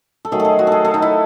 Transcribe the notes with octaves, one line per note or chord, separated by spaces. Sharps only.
A4
D#3 F#3 A3 G#4
A4
G#4
F#4
G#4 A4
A4
D#4
E4